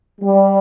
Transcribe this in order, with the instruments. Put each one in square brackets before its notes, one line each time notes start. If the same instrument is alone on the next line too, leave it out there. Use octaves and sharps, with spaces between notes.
[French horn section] G3